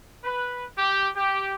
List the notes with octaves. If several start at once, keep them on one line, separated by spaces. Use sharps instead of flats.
B4
G4
G4